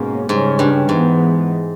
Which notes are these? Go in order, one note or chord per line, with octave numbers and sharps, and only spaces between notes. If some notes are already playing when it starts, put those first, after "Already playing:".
Already playing: G#2 B2 A#3 C#4
G#2 C#3 G3 C#4
G2
G#2 E3 G#3 B3